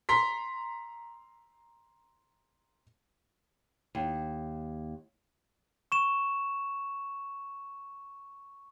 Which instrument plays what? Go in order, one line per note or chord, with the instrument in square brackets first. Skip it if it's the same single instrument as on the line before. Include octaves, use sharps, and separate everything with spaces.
[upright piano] A#5 C6 B6
[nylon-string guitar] D#2
[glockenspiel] C#6 E7